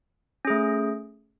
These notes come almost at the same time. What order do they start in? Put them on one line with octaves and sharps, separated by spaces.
C#4 G#4 A3